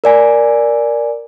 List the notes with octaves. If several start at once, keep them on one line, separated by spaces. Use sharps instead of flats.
A#4 D5 G#5